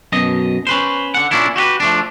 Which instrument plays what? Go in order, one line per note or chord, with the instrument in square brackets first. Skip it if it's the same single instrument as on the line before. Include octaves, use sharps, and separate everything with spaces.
[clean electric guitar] F#2 B2 D#5
C#4 B4 C5
D3 F#5
A#2 C#4 D4 E4
F#4 G4 A4 B4
F3 A3 D4